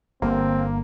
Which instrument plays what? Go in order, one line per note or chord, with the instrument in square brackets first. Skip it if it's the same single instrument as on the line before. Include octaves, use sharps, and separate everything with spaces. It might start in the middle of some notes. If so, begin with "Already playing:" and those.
[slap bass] G1 D3 [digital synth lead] A#3 [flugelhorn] C4